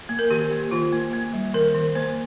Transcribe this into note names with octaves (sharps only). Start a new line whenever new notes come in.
A#3
A#4
D#3 G4
A#3
D#3 F4
A#3
A#3
G3
D#3 A#4
D#3
A#3 C5